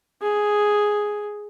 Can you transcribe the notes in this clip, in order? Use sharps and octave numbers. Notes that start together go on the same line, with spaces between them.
G#4